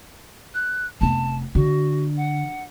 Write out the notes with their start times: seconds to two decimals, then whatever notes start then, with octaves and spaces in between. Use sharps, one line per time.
0.55 F#6
1.01 F1 B3 A5
1.55 D3 F#4
2.17 F#5